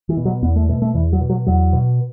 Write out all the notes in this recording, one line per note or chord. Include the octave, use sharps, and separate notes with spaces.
E3
B2
F#3
E2 B3
A3
B2 A3
A3
E2 E3
F#3
B2
F#3
E2 F#3
B2